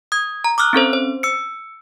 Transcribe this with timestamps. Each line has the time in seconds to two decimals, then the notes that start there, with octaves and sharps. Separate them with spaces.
0.12 D#6 G#6
0.44 A#5
0.58 D6 D#6 F6 F#6
0.73 C4 C#4 A4 C5
0.93 C5
1.23 E6 C#7